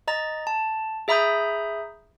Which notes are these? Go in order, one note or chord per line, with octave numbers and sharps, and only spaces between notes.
D#5 A#5 A6
A5
G#4 E5 A#5 B5 D#6 G6